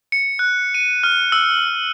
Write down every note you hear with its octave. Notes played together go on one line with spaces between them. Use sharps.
C#7
F#6
D#7
F6
E6